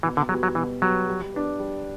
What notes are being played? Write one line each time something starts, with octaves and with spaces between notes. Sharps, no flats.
B2 E3
D3
F#3 G3 B3 F#4
F#3
B2 E3
F#3 G3 B3 F#4
G3
B3 D4
G3